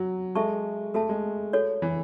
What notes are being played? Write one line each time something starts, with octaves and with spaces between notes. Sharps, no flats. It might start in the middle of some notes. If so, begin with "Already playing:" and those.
Already playing: F#3
G#3 A4 E5 A5 C#6
A3 F#4 A4 E5 A5
G#3
F#4 A4 C#5
E3